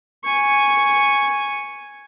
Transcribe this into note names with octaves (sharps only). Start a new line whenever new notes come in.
G#5 C#6